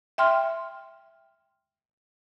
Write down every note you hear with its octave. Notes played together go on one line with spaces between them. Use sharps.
E5 G5 C6 F6